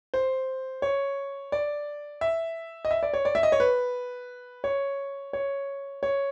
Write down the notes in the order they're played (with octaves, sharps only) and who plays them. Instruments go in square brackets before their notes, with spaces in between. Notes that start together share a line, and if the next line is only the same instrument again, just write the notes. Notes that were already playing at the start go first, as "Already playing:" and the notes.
[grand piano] C5
C#5
D5
E5
D#5
E5
D5
C#5
D5
E5
D#5
C#5
B4
C#5
C#5
C#5